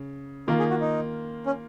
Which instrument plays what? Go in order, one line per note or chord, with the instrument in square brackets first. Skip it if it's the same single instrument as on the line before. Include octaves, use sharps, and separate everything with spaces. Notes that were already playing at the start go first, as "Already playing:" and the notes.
Already playing: [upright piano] C#3
[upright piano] D#3 A#3 F4 [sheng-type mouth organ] A#4
[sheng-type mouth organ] G#4
F#4
D#4
C#4